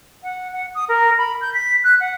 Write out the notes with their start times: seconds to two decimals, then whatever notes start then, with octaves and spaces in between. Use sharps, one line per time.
0.23 F#5
0.52 F#5
0.74 D#6
0.88 A#4
1.17 B5
1.40 G6
1.53 B6
1.83 F#6
2.00 F#5